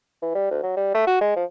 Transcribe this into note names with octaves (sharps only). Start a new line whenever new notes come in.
E3
G3
D2
F#3
G3
A3
F#4
G#3
F3